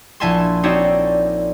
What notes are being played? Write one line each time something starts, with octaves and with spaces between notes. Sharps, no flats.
A#1 E4 E5 G#5 A5 C6
C4 D#4 F#4 C#5 D5 E5